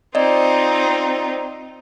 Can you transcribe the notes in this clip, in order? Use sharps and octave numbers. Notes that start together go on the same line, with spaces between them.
C4 D#4 F4 D5 D#5